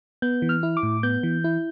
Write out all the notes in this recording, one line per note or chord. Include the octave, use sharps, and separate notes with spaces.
B3 G6
E3
F6
E4
D6
A2
B3 G6
E3
E4